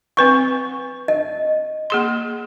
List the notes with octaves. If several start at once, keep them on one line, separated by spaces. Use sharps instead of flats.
C4 B4 F#5 C#6
D#5
A#3 G#4 C6